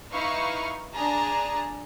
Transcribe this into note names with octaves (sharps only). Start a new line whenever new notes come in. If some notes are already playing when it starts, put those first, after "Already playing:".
D#4 E4 B4 F5 C#6
D4 G#4 A5 A#5